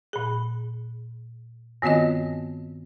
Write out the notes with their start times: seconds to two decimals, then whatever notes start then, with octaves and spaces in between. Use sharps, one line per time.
0.13 A#2 G#4
1.82 G2 D#3 B3 C4 F4 D#5